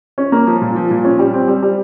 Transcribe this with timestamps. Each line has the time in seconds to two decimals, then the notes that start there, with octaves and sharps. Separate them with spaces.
0.18 C#4
0.32 A#3
0.47 F3
0.62 A#2
0.76 F3
0.91 A#2
1.04 C#4
1.19 G3
1.33 C4
1.48 G3
1.63 G3